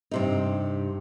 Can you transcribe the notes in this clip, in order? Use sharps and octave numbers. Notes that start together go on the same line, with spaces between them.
G2 C3 D#4